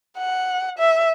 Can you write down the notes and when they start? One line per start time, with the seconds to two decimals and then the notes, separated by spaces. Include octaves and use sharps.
0.18 F#5
0.78 E5